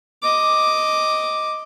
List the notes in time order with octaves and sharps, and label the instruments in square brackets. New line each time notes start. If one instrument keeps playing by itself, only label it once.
[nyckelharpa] D#5 D6